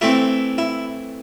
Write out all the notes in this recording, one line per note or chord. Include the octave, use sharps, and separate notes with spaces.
E3 A3 C4 E4
E4